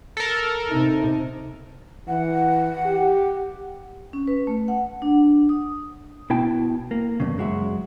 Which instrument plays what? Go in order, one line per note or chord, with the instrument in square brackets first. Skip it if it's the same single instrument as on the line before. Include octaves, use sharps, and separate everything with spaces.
[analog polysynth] A4 A#4
[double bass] C3 D#4
[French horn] E3 [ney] F#5
[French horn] G4
[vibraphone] C#4
B4
A3
F#5
D4
D#6
[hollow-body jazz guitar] B2 E4 G5 A5
A#3
E2 G2 C#3
F#2 G#3 F#4 E5